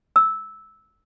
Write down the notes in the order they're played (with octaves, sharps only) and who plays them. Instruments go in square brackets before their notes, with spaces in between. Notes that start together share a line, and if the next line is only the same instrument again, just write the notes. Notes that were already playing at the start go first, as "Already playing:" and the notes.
[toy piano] E6